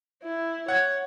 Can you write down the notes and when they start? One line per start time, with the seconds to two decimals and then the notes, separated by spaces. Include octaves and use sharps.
0.23 E4
0.68 C#5 F#5 G#6